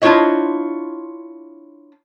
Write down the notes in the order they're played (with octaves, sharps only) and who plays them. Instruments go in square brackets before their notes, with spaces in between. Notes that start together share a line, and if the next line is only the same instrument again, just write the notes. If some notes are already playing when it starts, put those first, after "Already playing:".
[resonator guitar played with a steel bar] D4 E4 F4 C5 C#5 D#5